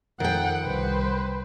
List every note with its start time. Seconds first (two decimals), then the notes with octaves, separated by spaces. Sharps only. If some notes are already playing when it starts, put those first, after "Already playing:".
0.20 F2 D#3 F#5 G5
0.64 C2 B4 C5